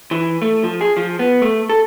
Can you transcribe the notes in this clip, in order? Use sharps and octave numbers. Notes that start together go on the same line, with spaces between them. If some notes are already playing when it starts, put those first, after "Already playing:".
E3
A3
F3
G#4
F3
B3
A3
A4